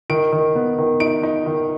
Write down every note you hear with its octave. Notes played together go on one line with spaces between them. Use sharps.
D#3 D7
D#3
B3
D#3
D#4 D7
D#4
D#3